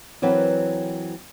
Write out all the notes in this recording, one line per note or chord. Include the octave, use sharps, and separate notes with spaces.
E3 F#3 C4 A#4 B4